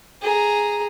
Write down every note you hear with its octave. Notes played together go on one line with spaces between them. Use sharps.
G#4 A#5